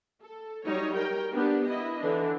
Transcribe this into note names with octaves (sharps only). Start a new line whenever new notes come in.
A4
F#3 G3 D#4 C#5
A#4 G5
B3 D4 G4
E4 D#5
D3 E3 D4